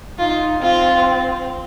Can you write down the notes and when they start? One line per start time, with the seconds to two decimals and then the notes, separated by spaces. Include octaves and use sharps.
0.19 D#4 F4
0.62 C4 F4